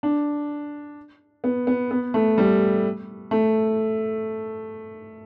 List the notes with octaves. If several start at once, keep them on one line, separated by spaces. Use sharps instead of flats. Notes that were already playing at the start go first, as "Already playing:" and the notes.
D4
B3
B3
B3
A3
G3
A3